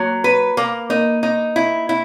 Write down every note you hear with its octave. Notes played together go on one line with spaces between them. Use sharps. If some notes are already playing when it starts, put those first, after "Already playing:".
Already playing: F#3 A#3
B4
A#3
A#3 D#4
D#4
E4
E4